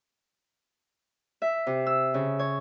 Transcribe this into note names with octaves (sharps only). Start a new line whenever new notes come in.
E5
C3
E6
C#3
C#5